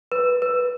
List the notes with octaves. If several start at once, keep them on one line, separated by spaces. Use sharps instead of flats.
B4
B4